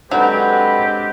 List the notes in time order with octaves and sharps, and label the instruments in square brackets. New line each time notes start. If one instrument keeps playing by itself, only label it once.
[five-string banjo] F#3 [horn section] G#3 C4 G4 [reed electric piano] D4 A4 [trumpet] B4